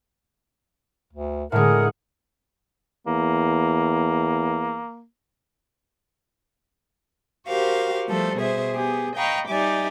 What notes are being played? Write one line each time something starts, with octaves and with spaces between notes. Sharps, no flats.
D2
A2 D3 G#3 G#4 A#4 F#5
E2 A#3
F#4 G4 A#4 C5 F5
F3 G3 A3 A4 C5
B2 G#4 C5 E5
B3 G4 G#4
D#5 F5 G5 A#5 B5 C#6
G3 D#4 G4 D5 E5 G#5